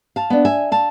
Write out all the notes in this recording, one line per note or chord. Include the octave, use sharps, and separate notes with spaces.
F5 A5
B3 D4
E5 G#5
F5 A5